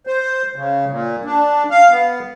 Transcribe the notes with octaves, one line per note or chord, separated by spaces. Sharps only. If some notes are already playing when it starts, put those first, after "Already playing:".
C5
C#3
A#2
D4
F5
B3